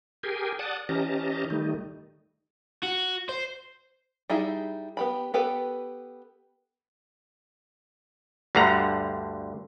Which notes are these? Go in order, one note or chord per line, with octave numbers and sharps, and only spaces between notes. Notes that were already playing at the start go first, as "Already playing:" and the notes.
G4 G#4 A#4 G5 G#5
D5 F#5 A5 D#6
E3 C#4 G4 D#5 A5 A#5
D#3 G3 A3 D#4
F#4
C5
G3 D#4 E4 G#4 E5
B3 G4 B5
B3 G4 A4 B4
D2 G2 D3 F#5 A#5